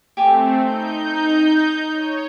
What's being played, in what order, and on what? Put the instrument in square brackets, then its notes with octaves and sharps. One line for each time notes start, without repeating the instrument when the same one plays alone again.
[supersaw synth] A3 C4 [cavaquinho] G4 G#5 D6
[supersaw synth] D#4 G6
C#5